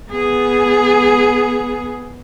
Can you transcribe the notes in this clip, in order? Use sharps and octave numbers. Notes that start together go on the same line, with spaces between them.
B3 G#4